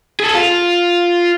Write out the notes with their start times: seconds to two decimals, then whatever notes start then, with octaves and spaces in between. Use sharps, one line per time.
0.20 G#4 A4
0.35 F4